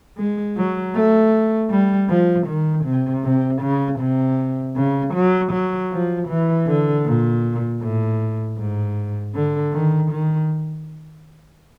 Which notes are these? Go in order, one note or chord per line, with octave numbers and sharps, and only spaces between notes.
G#3
F#3
A3
G3
F3
D#3
C3
C3
C#3
C3
C#3
F#3
F#3
F3
E3
D3
A#2
A2
G#2
D3
D#3
D#3